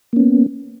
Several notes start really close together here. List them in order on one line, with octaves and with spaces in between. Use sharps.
A#3 C#4 B3